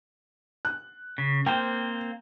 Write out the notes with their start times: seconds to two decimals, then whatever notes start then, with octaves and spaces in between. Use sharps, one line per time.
0.65 F#6
1.18 C#3
1.46 A#3 C4 C5 G5